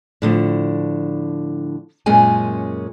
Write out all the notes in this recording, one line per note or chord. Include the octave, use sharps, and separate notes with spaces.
A2 D3 F3
F#2 A#2 G#3 C#4 G#4 G#5